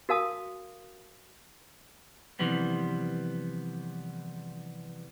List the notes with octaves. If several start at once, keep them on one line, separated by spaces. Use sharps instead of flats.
F#4 A#4 F5 A5 D#6
C3 E3 F3 G3 B3